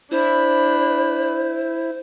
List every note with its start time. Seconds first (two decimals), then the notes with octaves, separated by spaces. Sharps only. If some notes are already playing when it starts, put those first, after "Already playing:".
0.12 D4 E4 C5 B5